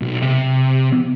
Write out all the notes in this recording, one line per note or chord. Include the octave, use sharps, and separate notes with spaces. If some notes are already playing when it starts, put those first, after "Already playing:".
B1
C3